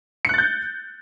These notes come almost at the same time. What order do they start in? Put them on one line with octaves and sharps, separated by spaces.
C#7 F#6 A6 G6